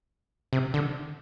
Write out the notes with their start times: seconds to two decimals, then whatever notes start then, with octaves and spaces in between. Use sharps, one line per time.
0.53 C3
0.74 D3